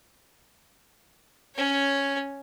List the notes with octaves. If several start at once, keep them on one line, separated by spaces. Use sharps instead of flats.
C#4 C#5